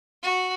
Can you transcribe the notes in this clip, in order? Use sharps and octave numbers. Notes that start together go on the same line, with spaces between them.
F#4